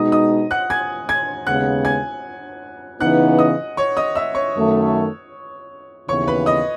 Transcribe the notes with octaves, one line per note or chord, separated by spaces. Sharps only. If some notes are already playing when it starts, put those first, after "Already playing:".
Already playing: B2 G#3 D#4 D#5 D#6
D#5 D#6
F#5 F#6
G#5 G#6
G#5 G#6
D#2 C#3 G#3 B3 F#5 F#6
G#5 G#6
C#3 E3 B3 D#4 F#5 F#6
D#5 D#6
C#5 C#6
D#5 D#6
E5 E6
C#5 C#6
F#2 D#3 A3
D#2 C#3 E3 B3 C#5 C#6
B4 B5
D#5 D#6